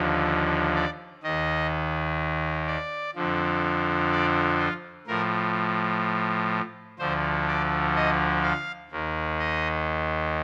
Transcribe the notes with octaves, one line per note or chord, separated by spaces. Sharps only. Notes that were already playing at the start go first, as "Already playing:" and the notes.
Already playing: D#2 D3 F3
D5
D#2 D#3 D#5
D5
F2 D3 F3
D5
F4
A2 F3 A#4
D2 D3 F3 C5
D5
D#5
F5
D#2 D#3
D#5